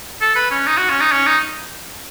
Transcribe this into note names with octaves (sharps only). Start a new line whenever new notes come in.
A4
B4
C#4
D#4
F#4
C#4
D#4
C#4
D#4